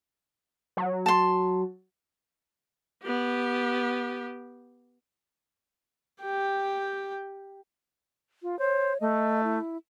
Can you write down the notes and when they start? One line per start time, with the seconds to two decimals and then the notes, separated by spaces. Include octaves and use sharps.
0.77 F#3
1.06 A5 C6
3.03 B3 G4
6.21 G4 G5
8.42 F4
8.59 C5 C#5
9.00 A3 D#5
9.44 E4